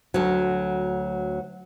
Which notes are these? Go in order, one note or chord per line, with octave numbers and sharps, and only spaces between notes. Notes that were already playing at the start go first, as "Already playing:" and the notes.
D2 F#3